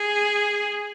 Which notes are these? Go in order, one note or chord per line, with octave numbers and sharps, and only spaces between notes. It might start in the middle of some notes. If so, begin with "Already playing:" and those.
Already playing: G#4